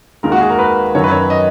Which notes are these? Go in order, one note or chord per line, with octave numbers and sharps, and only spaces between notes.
D#2 D#3 G#3 A#4
F#4
G#4
A#4
B4
F#2 D#3 F#3 C#5
B4
C#5
D#5